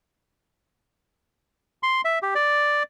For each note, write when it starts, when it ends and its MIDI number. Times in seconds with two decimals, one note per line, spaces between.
1.83 2.01 84
2.05 2.19 76
2.22 2.34 67
2.35 2.83 74